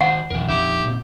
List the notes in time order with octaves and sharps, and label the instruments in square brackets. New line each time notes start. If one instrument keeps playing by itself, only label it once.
[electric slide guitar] D#3 C5 [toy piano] F#5
[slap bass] B1 F2 [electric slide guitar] E3 A#4
[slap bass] A#1 F2 [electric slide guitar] D#4 E5 [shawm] G4
[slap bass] A#2 G#3 C4